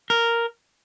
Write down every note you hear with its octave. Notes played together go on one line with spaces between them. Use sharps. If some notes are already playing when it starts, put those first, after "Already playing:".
A#4